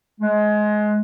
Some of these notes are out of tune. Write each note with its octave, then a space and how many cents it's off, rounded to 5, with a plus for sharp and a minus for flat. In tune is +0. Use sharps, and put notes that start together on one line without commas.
G#3 +20